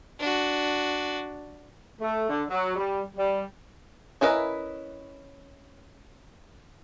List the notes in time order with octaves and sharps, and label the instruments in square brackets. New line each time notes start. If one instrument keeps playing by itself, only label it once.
[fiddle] D4 F#4
[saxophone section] A3
D3
F#3
G3
G3
[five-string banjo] C#4 E4 A#4 B4 D#5